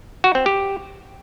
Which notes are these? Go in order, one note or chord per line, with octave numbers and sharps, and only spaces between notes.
F#4
C4
G4